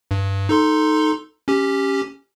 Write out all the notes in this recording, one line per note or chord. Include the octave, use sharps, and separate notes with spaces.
G2
D#4 A4 C6
C#4 G4